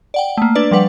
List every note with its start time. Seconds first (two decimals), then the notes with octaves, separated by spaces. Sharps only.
0.14 D5 F#5 G5
0.37 A3 A#3
0.55 D4 B4 D5
0.71 F3 G3 B4 F#5